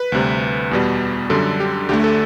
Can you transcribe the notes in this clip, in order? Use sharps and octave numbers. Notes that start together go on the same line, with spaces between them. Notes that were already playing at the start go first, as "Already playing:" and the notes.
Already playing: B4
D2 C3 G3
E2 B2 G3
F#2 D3 G3 A4
G4
D2 D3 A3 G4
A4